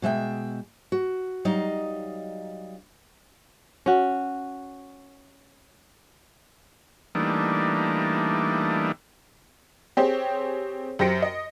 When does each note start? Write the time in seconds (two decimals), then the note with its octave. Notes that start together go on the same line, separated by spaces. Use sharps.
0.02 B2 G#3 E5 G5
0.92 F#4
1.45 F#3 G3 D#4 D#5 F5 A#5
3.86 C#4 F#4
7.15 E3 G3 A3 A#3 D4 D#4
9.97 C4 G4 G#4 C5 C#5
10.99 F#2 G4 C5 A#6 C#7 D7
11.22 D#5